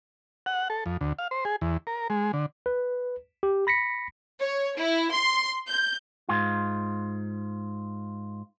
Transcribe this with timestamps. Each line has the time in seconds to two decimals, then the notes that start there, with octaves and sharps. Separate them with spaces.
0.46 F#5
0.70 A4
0.86 F2
1.01 D2
1.19 F5
1.31 C5
1.45 G#4
1.61 E2
1.87 A#4
2.10 G#3
2.33 D3
2.66 B4
3.43 G4
3.67 B5 A#6 B6 C#7
4.40 C#5
4.78 E4
5.14 C6
5.69 G6
6.29 G#2 F4